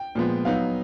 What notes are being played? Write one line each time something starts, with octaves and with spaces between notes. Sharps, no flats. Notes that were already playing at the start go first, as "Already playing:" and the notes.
Already playing: G5
A#2 F3 G#3 B3
F#3 B3 D#4 F5